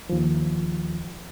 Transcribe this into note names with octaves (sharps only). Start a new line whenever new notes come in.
D#2 F3